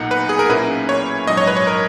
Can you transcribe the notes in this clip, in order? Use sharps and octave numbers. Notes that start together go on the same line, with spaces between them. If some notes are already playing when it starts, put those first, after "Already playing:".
Already playing: B1 A#2 A#3 D#4 F#5
B4
G#4
A#4
B1 A#2 A#3 C#4 E4 B4
C#5
A#1 G#2 F#3 D#5
C#5
B4
C#5
A#4